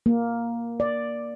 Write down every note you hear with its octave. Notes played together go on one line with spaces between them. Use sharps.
A#3
D5